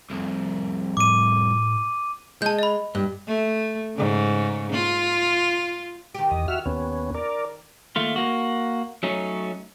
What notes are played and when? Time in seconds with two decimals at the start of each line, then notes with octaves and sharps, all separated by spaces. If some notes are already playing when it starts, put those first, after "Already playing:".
0.10 C2 F2
0.97 A2 D6 D#7
2.42 G#3 A5 G6
2.59 D#5 B5
2.95 G2
3.27 A3
3.95 G#2 C#3
4.72 F4
6.14 D#3 G4
6.31 E2 D#5
6.48 F#4 E5 F6
6.66 D#2 B3 C#4
7.15 A#4 D5
7.96 D#2 A3 F4
8.16 A#3 F#4
9.03 F#3 A3 C#4 D#4